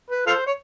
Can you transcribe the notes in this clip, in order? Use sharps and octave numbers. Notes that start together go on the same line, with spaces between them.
B4
F4 A4 C5
C#5